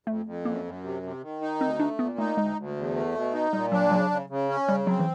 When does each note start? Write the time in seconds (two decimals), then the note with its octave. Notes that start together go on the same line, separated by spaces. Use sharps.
0.06 F2 A3
0.26 F2
0.45 F#2 A#3
0.65 F#2
0.83 C3
1.03 C3
1.22 D#3
1.41 D#4
1.61 D2 C4
1.79 A3 D4
1.99 A#2 B3
2.18 A3 D#4
2.37 D2 G#3
2.57 D2
2.76 E2
2.95 A3
3.14 B2
3.33 D#4
3.53 A#2 G3
3.72 F#3 D4
3.91 C#3 F#3
4.10 C#3
4.29 C#3
4.49 C#4
4.68 C#3 G3
4.87 F#3 C4
5.00 E3